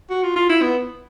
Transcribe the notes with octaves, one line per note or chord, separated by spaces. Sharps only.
F#4
F4
F4
E4
B3